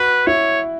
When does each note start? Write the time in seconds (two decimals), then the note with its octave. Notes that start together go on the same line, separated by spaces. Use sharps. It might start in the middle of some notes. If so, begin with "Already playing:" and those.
Already playing: F#4 B4
0.27 E4 C#5